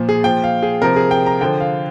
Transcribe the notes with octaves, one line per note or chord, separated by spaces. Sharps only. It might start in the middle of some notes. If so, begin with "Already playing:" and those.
Already playing: A#2 F3
G#4
A#2 F3 G5
F5
G#4
C3 F3 A#4
G#4
G5
A#5
D3 F3 G5
F5